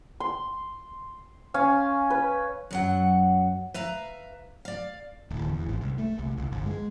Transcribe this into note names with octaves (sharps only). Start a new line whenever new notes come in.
C6
C#4 F5
B4
F#2 F#3 F#5
B4 E5 F5 A#5
D5 F5
D1
E2
G#1
C2
A3
C2
C2
G1
G#3